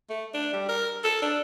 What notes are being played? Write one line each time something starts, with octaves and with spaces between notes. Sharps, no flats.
A3
D4
G3
A#4
A4
D4